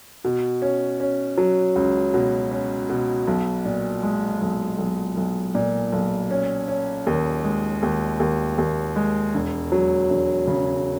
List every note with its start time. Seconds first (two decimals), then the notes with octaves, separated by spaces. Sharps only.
0.24 B2
0.62 C#4
1.00 C#4
1.38 F#3
1.76 C#2
2.14 B2
2.51 C#4
2.89 B2
3.27 B1
3.65 A#2
4.03 G#3
4.41 B1
4.79 B1
5.17 B1
5.55 A#2
5.92 B1
6.31 C#4
6.68 C#4
7.07 D#2
7.44 G#3
7.82 D#2
8.20 D#2
8.58 D#2
8.96 G#3
9.34 E1
9.72 F#3
10.10 E1
10.47 C#3